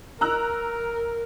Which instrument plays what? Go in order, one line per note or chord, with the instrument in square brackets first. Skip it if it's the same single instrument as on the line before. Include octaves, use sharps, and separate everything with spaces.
[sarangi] A#4 [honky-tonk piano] A#5 E6 F#6